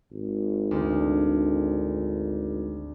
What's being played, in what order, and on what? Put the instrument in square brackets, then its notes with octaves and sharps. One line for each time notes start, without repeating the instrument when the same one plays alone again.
[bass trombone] G#1
[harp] D2